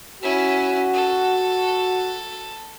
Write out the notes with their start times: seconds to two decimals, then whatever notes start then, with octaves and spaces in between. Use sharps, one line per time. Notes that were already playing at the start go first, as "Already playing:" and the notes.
0.22 C#4 E4 F#4
0.93 A4